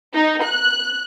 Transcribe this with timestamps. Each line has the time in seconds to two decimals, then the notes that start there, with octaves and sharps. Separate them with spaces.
0.14 D#4
0.44 F#6